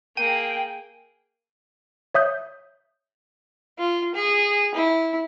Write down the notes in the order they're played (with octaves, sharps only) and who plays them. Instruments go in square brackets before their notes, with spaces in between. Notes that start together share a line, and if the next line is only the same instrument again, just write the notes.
[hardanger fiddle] A#3 G#4 [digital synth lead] G5 [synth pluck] D#7
[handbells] C#5 E5 D#6 G6
[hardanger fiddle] F4
G#4
E4